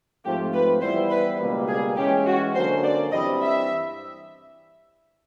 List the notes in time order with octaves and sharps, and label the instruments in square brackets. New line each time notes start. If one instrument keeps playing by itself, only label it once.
[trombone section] G#2 F3 A3 C4 F4 [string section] G4
[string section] B4
[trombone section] E3 G3 B3 E4 [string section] C5
[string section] B4
[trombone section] C#2 B2 G3 A#3
[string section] G#4
[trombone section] E3 G#3 C#4 [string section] G4
[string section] F#4
[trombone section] D3 F#3 A#3 C#4 F#4 [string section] C5
[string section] D5
[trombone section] G2 E3 G3 C4 E4 [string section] D#5
[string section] E5